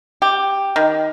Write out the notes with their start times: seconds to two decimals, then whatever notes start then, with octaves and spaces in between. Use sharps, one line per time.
0.22 G4
0.76 D#3